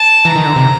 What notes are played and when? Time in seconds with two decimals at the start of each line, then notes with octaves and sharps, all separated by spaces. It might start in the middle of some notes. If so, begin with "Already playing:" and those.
Already playing: A5
0.25 E3 A#5
0.36 D#3
0.46 D3
0.56 C3